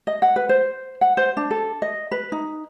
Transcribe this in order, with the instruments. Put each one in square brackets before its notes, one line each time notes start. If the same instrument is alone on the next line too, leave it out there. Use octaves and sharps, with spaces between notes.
[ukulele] D#5
F#5
B4
C5
F#5
C5
D4
A4
D#5
B4
D#4